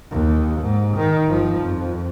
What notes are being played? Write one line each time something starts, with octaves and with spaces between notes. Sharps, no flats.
D#2
G#2
D#3
G1 F3
F2